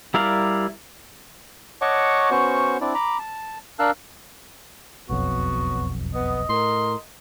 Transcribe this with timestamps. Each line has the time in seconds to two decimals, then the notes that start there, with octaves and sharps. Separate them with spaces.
0.14 G3 E4 A#4 D5 F5
1.81 C#5 D#5 F#5 A5 C#6 D6
2.31 B3 C#4 F#4 C5 C#6
2.81 C4 D4 E4 D5
2.94 A#5 B5 D6
3.19 A5
3.79 D4 A#4 F5 A5 E6 F#6
5.09 E1 B1 F2 F#3 B3 F#4
6.14 B3 D#5
6.49 A2 A#4 C6